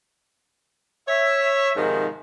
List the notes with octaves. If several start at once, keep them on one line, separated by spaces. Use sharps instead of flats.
C#5 E5
G#2 C3 D#3 F3 G#3